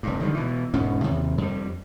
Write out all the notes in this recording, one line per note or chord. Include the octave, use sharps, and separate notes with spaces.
F1 G2
D3 D#3 F#3 G3
B2 E3
E1 G#2 C#4
D#2 C3
F2 G3